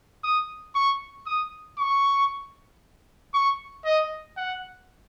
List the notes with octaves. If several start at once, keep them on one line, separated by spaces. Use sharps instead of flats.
D#6
C#6
D#6
C#6
C#6
D#5
F#5